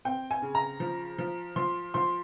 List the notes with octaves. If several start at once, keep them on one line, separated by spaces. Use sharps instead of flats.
C4 G5
G#5
C#3
A#5
F3
F3
F3 C6
F3 C6